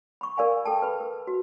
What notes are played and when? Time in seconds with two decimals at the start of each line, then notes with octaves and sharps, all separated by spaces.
0.21 B5 C#6
0.37 A#4 D5 F5 G#5 B5
0.66 A4 G5 A5
0.82 B4 B5
1.00 A#4
1.27 F#4